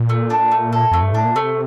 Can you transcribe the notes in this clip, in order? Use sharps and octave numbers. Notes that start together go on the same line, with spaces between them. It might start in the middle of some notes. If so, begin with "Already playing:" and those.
Already playing: A#2
A3
D4
A3
A4
F2 A3
G2
A2 D4
A#2
C3 A3